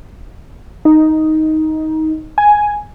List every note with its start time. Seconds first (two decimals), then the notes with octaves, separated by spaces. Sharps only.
0.85 D#4
2.38 G#5